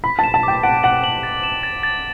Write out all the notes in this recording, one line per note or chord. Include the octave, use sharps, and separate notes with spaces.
B5 B6
A5
E7
A5
G5 D6
F#5 D7
F#5 F#7
F#7
A6
E7
A6
A6